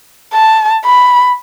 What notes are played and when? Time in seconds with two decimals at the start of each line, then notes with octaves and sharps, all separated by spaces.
0.33 A5
0.85 B5